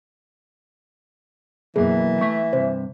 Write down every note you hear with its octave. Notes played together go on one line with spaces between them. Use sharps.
F#2 B2 E3 F#3 A#3 G#4
A3 E5 C#6
G2 C3 C5